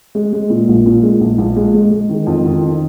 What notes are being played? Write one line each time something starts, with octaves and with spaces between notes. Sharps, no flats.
G#3
G#3
A#2
A#1
A#2
G#3
A#1
A#1
G#3
G#3
G#3
D#3
F2
D#3
D#3